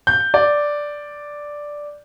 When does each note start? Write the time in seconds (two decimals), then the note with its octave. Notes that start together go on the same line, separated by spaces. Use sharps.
0.07 G6
0.34 D5